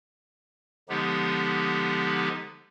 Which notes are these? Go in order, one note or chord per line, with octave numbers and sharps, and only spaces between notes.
D3 F3 G#3 B3 D#4 G4